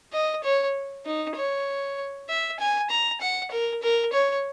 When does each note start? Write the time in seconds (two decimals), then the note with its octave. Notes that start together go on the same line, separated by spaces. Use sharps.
0.13 D#5
0.44 C#5
1.06 D#4
1.36 C#5
2.29 E5
2.59 G#5
2.90 A#5
3.21 F#5
3.51 A#4
3.83 A#4
4.13 C#5